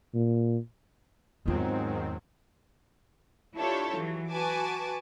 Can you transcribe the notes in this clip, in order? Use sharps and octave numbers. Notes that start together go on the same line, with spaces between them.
A#2
E2 G#2 D#3 F#3 C4 F4
D4 E4 F4 G4 A4 C#5
E3 F#3
F#4 B4 G#5 A5 D6